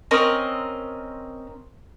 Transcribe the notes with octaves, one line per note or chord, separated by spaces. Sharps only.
C4 C#4 A#4 D#5